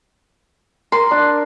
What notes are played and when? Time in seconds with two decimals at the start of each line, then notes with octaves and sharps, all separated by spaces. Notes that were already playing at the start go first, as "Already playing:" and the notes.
0.92 A#4 C6
1.11 D4 D6